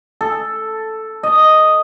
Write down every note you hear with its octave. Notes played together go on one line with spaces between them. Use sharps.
A4
D#5